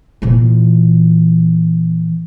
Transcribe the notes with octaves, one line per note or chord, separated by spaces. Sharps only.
A#2 E3